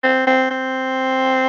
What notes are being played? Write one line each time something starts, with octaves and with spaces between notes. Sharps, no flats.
C4
C4
C4